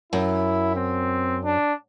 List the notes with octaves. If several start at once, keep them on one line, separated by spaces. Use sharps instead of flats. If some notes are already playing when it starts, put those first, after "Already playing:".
F#2 E4
C4
D4